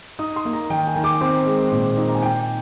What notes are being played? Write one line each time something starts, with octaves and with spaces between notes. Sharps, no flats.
D#4 D#6
C6
A#3
A#5
D#3 G5
G#5
D#3
D6
C4 D6
G#3
A#2
D#4
A#5
G#5
D#4 G5